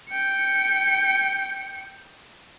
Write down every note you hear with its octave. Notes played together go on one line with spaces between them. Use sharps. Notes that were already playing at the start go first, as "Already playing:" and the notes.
G5 C#7